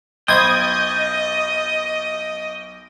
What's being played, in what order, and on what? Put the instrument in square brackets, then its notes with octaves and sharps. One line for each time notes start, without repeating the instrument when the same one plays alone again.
[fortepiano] B1 C5 B5 [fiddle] D#5 [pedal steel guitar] G5 [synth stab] D#6 G#6